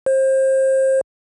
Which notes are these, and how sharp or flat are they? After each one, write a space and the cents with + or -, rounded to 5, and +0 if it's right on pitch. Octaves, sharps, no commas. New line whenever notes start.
C5 +30